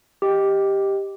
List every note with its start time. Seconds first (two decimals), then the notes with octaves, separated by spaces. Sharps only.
0.22 G4 D#5